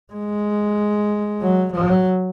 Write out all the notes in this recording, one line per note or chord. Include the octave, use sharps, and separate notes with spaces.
G#3
F#3
F#3